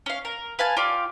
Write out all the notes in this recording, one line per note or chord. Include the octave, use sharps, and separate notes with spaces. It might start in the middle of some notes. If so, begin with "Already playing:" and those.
C#4 F5
A#4
B4 F5 G#5 A5
F4 G4 D5 F5